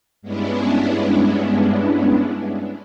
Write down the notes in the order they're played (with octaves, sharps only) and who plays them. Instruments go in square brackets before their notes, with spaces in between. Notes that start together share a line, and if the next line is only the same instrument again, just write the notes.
[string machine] G2 G#3 B3 C#4 D4 E4